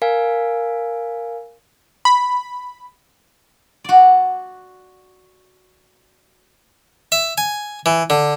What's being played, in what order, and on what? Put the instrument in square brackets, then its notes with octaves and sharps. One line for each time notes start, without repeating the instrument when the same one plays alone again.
[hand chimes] A#4 F5 G#5
[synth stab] B5
[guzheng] F#4 D5
[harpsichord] E5
G#5
E3
D3